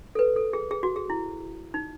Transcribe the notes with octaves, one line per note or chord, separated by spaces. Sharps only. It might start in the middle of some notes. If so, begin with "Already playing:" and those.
A4
B4
A4
G#4
G#4
F#4
G#4
E4
D#4